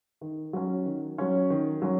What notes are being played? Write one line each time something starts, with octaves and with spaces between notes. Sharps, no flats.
D#3
F#3 C#4
D#3
F#3 C#4
D#3
F#3 C#4